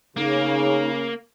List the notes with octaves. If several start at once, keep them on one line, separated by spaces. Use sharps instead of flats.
C#3 A#3 D#4